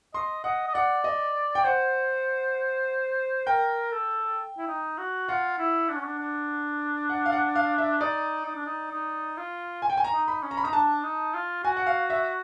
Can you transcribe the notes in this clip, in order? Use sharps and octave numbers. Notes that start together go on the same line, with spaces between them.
D#5 C6
D#5 F#5
D#5
D5 F#5
D#5
G5
C5 F#5
A#4 G5
A4
E4
D#4
F#4
F4 F#5
E4
D4
C#4
D4
D4
F#5
F5
F#5
F5
E5
D#4 D5
D#4
D4
D#4
D#4
F4
G#5
G5
G#5
A#5
D#4
B5
C#4
A#5
B5
D#4 A#5
D4 A5
D#4
F4
F#4 G#5
F#5
F5
E5